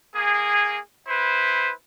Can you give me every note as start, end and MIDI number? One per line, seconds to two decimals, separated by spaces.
0.16 0.78 58
0.16 0.78 68
1.07 1.71 64
1.07 1.71 71
1.07 1.71 72